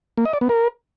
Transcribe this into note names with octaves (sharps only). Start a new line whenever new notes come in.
A#3
D#5
D5
B3
A#4